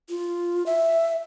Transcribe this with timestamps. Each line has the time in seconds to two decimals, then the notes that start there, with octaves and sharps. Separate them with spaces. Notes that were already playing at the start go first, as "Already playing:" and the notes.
0.09 F4
0.66 E5